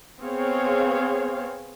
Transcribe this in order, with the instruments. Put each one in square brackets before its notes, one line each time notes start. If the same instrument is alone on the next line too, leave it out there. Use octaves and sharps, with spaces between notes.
[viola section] B3 C4 G#4 C#5 F5